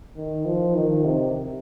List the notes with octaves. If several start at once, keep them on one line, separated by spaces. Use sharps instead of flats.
D#3
F3
D#3
C3